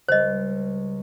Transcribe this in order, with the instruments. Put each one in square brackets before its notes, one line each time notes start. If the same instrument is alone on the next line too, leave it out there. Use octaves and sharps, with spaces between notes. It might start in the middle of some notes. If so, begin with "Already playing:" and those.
[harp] C#2 G3 [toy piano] C5 D#5